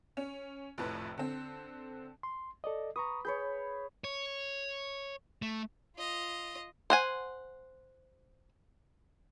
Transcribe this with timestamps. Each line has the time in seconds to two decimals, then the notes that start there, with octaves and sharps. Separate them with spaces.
0.17 C#4
0.78 F1 A#1 F2 A2 B4
1.18 D3 C4
2.23 C6
2.64 A4 D5 D#5
2.96 B4 A#5 C#6 D#6
3.25 G#4 B4 C#5 G6
4.04 C#5
5.42 A3
5.96 F4 D#5
6.90 C5 F#5 G#5